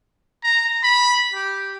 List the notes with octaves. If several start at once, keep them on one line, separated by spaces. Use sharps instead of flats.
A#5
B5
G4